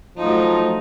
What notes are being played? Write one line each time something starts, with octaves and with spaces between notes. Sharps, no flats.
F3 F#3 A3 D#4